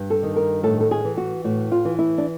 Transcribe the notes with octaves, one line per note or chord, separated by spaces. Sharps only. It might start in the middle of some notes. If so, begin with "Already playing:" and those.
Already playing: G2
A4
D#3
A#4
A2 A4
A4
G#4
E3
F#4
A2 F#4
F4
E3
E4
D4